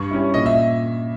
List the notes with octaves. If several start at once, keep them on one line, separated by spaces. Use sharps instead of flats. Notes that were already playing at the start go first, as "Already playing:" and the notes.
Already playing: G2 C#6
G3 C#4 E4
A#2 D#5
E5